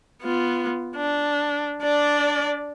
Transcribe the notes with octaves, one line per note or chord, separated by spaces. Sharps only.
B3 F4
D4
D4 D5